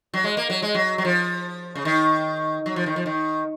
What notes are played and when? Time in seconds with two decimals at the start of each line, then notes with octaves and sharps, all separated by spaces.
0.14 F#3
0.24 G#3
0.37 A#3
0.50 F#3
0.62 G#3
0.74 F#3
0.98 F#3
1.05 F3
1.75 C#3
1.85 D#3
2.66 F#3
2.76 F3
2.86 D#3
2.96 F3
3.06 D#3